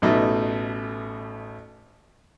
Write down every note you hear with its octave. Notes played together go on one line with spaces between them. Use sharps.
A1 B2 A3 D#4